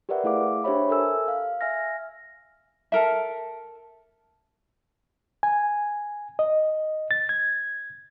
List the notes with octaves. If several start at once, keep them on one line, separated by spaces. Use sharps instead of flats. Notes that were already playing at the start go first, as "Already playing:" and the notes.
G4 A#4 B4 D5 E5 F#5
A3 E4 G#4 F5 D6
D4 G4 C5 C#5 E5 B5
A4 A#4 E5 G#5 E6
F5
E5 G#5 F6 A#6
A4 A#4 E5
G#5
D#5
A6
G#6